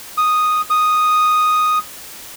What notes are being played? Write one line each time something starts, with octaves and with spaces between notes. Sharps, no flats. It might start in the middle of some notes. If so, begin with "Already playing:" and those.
D#6
D#6